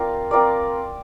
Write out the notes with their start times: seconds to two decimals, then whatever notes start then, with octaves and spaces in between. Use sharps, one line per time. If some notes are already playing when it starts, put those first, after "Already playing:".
Already playing: C4 F4 A#4 D5
0.31 C4 F4 A#4 D5